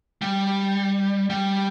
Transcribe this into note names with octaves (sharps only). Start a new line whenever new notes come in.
G3
G3